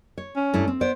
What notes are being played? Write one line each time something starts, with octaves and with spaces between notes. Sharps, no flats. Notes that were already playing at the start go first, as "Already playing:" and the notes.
C#5
C#4
G2 A3 E4
C4
B3 C5 D5